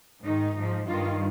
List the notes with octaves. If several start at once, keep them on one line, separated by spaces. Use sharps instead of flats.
G#2 D#3 D#4
G#2 F3
G2 D#3 F4